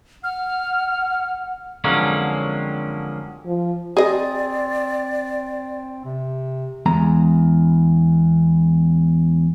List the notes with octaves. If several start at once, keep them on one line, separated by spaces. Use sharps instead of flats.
F#5 F6
F2 D3 F#3 G#3 A#3 C#4
F3
C4 G#4 D5 D#5
C3
E2 G#3 A#5